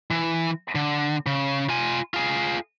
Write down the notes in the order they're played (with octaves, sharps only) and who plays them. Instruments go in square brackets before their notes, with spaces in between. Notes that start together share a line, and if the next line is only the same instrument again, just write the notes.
[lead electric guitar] E3
D3
C#3
F4 G#5
F4 G#4